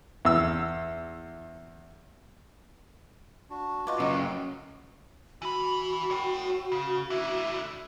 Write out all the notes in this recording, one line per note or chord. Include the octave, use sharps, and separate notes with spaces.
E2 E6
D4 F#4
D#4 F4 F#4 B4 D6
F#2 C#3 A#5
E3 F#4 B5
C#5 G5
C#3
D3 E4